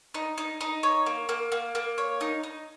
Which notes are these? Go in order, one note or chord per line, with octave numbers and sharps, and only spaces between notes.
D#4
D#4
D#4
C#5
A#3
A#3
A#3
A#3
C#5
D#4
D#4